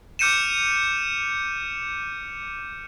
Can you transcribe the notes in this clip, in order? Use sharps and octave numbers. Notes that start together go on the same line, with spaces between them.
D6 F6 G6 C#7 D#7 E7